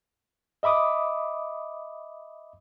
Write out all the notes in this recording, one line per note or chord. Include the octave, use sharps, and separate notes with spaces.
D#5 E5 B5 D6 D#6